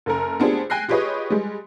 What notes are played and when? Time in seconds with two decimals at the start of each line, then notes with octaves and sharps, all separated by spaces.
0.06 F#1 A4 A#4
0.40 B3 C4 D4 F4 G4 G#4
0.70 G5 G#5 F#6 A#6 C7
0.88 F4 G4 G#4 B4 C#5 D#5
1.30 G3 G#3